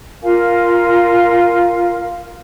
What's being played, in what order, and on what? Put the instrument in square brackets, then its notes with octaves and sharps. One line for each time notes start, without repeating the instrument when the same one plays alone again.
[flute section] F4 A#4 F5 G#5